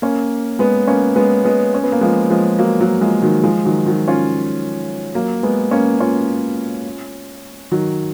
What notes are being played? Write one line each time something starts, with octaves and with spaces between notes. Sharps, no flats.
A#3 C#4
G#3 B3
A#3 C#4
G#3 B3
G#3 B3
C#4
B3
A#3
F3 G#3
F3 G#3
F#3 A#3
F#3 A#3
F3 G#3
D#3 F#3
F3 G#3
D#3 F#3
D#3 F#3
C#4 F4
F#3 A#3
G#3 B3
A#3 C#4
C#4 F4
D#3 F#3